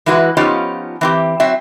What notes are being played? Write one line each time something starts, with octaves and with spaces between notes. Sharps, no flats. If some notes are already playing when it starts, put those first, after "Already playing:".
E3 G#3 E4 F#4 B4
F3 B3 C#4 D#4 F4 G4
E3 C4 G4
F#3 C4 E5